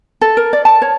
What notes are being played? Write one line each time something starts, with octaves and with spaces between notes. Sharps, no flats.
A4
A#4
D5
A5
C#5